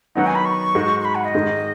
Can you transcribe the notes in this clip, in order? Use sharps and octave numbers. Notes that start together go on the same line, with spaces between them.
D#3 F#3 B3 D#4 F#5
G#5
B5
C#6
G#2 G#3 D#4 F#4
C#6
B5
F#5
D#5
G#2 D#3 G#3